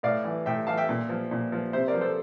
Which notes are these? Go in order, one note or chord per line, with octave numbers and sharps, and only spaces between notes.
A2 D5 F5
E3
A2 E5 G5
E3 F5 A5
E5 G5
A#2
F3
A#2
F3
C3 C5 E5
A#4 D5
F3
A4 C5